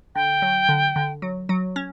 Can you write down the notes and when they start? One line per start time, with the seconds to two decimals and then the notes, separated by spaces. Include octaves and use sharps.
0.15 D3 G5
0.42 F#3
0.69 D3
0.96 D3
1.22 F#3
1.49 F#3
1.76 C#4